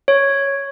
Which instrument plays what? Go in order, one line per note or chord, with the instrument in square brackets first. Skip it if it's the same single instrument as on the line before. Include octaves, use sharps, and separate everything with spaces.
[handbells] C#5